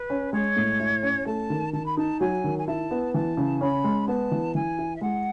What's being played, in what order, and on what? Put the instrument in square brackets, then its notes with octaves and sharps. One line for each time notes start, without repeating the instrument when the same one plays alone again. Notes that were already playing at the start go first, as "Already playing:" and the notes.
Already playing: [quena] B4
[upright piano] C#4
[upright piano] G#3 [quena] C#5
[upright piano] A2
E4
C#4
[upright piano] A3 [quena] A5
[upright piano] D#3
[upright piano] D#3 [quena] A5
[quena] B5
[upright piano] D#4 [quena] A5
[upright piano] F#3 [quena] G#5
[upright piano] D#3
[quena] G#5
[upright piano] E4 [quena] A5
[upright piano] B3
[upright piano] E3 [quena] A5
[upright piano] C#3
[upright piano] C#4 [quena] B5
[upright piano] G#3
[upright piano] B3 [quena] A5
[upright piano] E3
[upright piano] E3 [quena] G#5
[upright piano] E4
[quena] E5
[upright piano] G#3 [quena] F#5